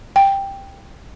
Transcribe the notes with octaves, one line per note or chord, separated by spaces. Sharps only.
G5